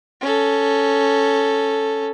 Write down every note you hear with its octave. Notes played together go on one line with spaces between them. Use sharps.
C#4 A4